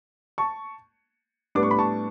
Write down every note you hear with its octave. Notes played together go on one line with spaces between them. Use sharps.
A5 C#6
A2 G3 B3 D4 D6
C#6
B5
A5 C#6